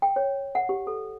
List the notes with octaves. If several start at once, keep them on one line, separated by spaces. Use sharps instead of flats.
G5
C#5
F#5
G4
A4